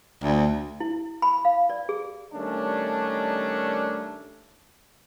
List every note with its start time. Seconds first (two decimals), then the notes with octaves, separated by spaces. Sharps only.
0.23 D2
0.80 E4
1.22 B5
1.45 F5
1.70 D5
1.89 G#4
2.34 D#3 G3 A3 C#4 D4